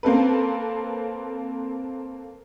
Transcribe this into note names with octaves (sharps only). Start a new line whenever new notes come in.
A#3 C4 A4 B4